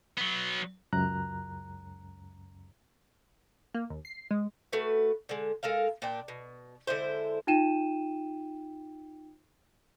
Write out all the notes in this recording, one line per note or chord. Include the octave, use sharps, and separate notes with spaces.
F#3 B3
C#2 F#2 A#5 F#6
A#3
D#2
C7
G#3
A3 F#4 B4
D3 G#3
G#3 A4 A#4 F5
A#2 D4 G5
B2
D3 G#3 E4 C5
D#4 F4 G5 D#7 E7